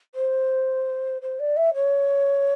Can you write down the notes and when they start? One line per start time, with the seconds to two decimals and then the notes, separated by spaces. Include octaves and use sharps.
0.14 C5
1.21 C5
1.39 D5
1.56 E5
1.74 C#5